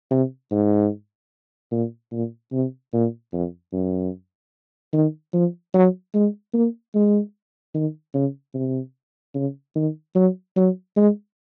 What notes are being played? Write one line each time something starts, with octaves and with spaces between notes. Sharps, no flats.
C3
G#2
A#2
A#2
C3
A#2
F2
F#2
D#3
F3
F#3
G#3
A#3
G#3
D#3
C#3
C3
C#3
D#3
F#3
F#3
G#3